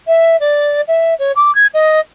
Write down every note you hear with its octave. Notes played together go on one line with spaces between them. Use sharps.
E5
D5
E5
C#5
D6
G#6
D#5